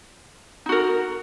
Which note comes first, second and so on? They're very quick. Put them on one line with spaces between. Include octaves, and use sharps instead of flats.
D#4 F#4 A#4